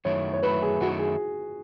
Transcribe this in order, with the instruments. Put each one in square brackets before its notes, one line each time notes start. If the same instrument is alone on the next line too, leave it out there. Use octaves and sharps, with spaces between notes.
[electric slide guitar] F#2 D#3 F#3 A3 E4 [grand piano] C#5
[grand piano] C#5
[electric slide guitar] F#2 D#3 F#3 A3 E4 [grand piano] B4
[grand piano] G#4
[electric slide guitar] F#2 D#3 F#3 A3 E4 [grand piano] F#4
[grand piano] G#4